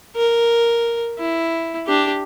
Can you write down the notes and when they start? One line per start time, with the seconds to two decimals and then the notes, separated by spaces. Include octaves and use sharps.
0.16 A#4
1.19 E4
1.87 D4 G4